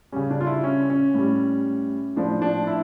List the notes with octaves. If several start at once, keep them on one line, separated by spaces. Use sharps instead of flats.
C#3 G3 C#4
D4
F4
E4
C#4
C#4
A2 G3
A2 F3 D4
D4
E4